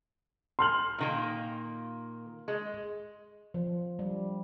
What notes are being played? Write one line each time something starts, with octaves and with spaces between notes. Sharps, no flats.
C6 F6 F#7
A#2 D#3 A#3
G#3
F3
G3